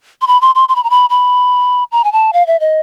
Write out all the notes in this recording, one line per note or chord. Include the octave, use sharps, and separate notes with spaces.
C6
B5
C6
C6
C6
B5
A#5
B5
B5
A#5
G#5
A5
F5
E5
D#5